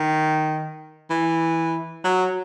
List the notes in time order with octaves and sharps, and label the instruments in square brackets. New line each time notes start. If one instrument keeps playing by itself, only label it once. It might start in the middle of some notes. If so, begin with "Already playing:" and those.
Already playing: [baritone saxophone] D#3
E3
F#3